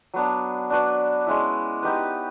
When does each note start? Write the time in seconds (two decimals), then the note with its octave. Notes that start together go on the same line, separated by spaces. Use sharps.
0.14 F#3 B3 D4
0.70 D4 F#4 B4 D5
1.26 G#3 C#4 E4
1.83 B3 D#4 G4 B4